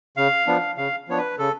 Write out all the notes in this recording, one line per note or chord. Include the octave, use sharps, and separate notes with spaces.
C#3 F5
F3 B3 D4
C#3 F5
F3 B3 D4 C#5
B4
C#3 A4